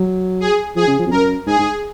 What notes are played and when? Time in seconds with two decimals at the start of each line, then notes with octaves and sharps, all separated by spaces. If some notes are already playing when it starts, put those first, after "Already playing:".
Already playing: F#3
0.40 G#4
0.76 F3 G#4
0.87 C#3
0.99 F3
1.07 F2
1.11 F#2 A#4
1.46 G#2 G#4
1.59 G#2